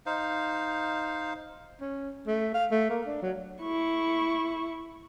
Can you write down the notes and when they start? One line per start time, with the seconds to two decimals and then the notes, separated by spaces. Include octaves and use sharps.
0.06 D#4 C5 F5
1.81 C#4
2.27 A3
2.54 F5
2.71 A3
2.90 A#3
3.06 D4
3.22 F#3
3.62 E4 C#6